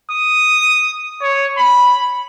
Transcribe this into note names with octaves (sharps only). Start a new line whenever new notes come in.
D#6
C#5
B5